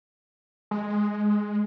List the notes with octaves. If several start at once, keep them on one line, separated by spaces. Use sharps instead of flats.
G#3